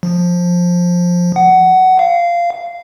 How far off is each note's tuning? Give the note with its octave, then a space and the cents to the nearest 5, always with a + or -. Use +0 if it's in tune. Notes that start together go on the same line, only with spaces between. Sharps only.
F3 +10
F#5 +15
F5 -15